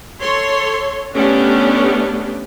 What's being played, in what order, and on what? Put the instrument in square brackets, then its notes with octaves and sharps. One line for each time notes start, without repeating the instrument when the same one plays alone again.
[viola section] A4 C#5 C6
A3 B3 C#4 D4 G4